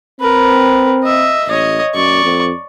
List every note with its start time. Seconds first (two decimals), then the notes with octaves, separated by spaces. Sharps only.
0.20 C4 A#4 B4
1.03 D#5 E5
1.48 A1 C#5 D#5
1.94 F#2 D5 C#6
2.24 F2